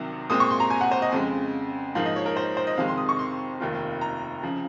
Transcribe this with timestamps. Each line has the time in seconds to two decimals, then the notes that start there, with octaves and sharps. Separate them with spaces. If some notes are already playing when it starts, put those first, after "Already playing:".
Already playing: C2 C3 D#3 F#3
0.30 A#2 G#3 C4 D#6
0.40 C#6
0.50 C6
0.60 A#5
0.70 G#5
0.81 F#5
0.91 C5
1.02 D#5
1.12 F2 C#3 G#3
1.95 G#2 F3 A#3 D#4 F5
2.06 D#5
2.16 C#5
2.26 A#4
2.37 C5
2.57 C5
2.67 D#5
2.78 F2 C3 D#3 G#3 F5
2.88 C6
2.98 D#6
3.09 C#6
3.19 C6
3.60 F1 D#2 D#3 A#3 F4
4.01 A#5
4.43 C#3 F3